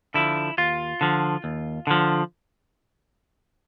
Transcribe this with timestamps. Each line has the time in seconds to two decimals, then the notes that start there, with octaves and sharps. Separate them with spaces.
0.14 D3 F3 E4
0.58 D#2 F4
1.01 D3 F3
1.44 D#2
1.87 D3 F3